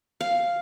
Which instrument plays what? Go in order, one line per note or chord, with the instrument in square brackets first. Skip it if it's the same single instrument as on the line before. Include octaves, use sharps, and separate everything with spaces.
[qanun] F5